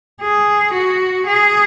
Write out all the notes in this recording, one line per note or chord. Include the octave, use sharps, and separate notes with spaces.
G#4
F#4
G#4